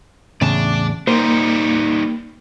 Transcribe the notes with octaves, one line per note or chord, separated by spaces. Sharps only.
E2 A2 C#3 D5 A5
G3 A#3 D#4 C5